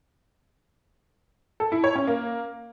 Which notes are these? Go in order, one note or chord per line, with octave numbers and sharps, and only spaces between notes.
A4
E4
C#5
C#4
A#3